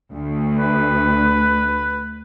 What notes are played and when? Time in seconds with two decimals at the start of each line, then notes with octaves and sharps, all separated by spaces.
0.14 D2
0.57 B4